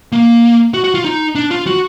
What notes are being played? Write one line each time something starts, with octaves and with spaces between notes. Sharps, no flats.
A#3
F#4
F#4
F4
D#4
D4
F4
F#4